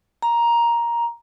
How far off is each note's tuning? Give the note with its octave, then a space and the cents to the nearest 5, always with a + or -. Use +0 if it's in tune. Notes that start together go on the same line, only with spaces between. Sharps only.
A#5 +10